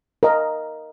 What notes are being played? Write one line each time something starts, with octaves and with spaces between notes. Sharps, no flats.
A#4 D#5